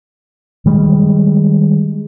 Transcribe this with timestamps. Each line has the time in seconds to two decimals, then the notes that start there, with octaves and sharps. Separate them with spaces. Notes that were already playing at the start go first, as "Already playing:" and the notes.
0.66 D#3 G3 G#3